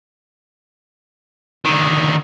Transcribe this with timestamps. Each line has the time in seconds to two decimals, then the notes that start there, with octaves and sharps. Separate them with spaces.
1.66 D3 D#3